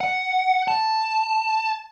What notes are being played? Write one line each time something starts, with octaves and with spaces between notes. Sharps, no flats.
F#5
A5